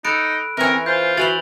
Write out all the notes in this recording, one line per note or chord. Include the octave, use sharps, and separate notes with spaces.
D#4 A4 B5 F#6 D7
E3 C4 C#4 A#4
F4 C5 G6
E3 F#4 B4 C5 A6 F7 F#7